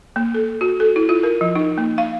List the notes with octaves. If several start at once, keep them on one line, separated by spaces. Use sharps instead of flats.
A#3
A4
F#4
A4
E4
F4
A#4
F3
D#4
A#3
F5